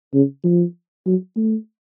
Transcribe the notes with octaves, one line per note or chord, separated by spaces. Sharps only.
C#3
F3
F#3
A3